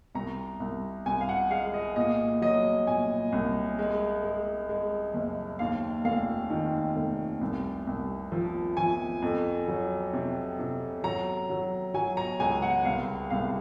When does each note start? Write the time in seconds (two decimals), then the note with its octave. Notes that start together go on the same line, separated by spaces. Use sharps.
0.15 C2 A#5
0.60 C2
1.06 C2 G#5
1.21 F5
1.29 F#5
1.51 G#3 F5
1.74 D#5
1.96 A#2 D#5
2.41 F#3 D#5
2.87 A#2 G#5
3.32 C2
3.79 G#3
4.23 G#3
4.69 G#3
5.14 F#1
5.59 D#2 F5
6.04 F1 F5
6.50 D#3
6.96 F1
7.41 C2
7.87 C2
8.32 F3
8.77 F3 G#5
9.22 F2
9.68 F#3
10.13 C3
10.59 C3
11.04 F#3 A#5
11.50 F#3
11.94 F#3 G#5
12.17 A#5
12.40 C#2 G#5
12.62 F#5
12.85 C2 F5
13.30 C2 F5